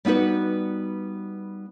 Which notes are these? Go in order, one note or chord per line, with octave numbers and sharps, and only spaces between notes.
G3 B3 D#4 F#4 B4